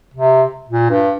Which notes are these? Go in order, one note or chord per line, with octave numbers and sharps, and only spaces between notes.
C3
A#2
G2